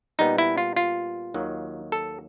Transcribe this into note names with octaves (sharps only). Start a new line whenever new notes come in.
A#2 G3 B3 D#4
E4
F4
F4
D#2 D#3 F#3
A4